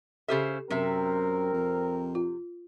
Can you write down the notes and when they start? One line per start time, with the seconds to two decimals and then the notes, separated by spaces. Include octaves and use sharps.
0.28 C#3 G4 A4 C5 E5
0.70 F#2 C3 C4 A#4 E5
1.54 F2
2.15 F4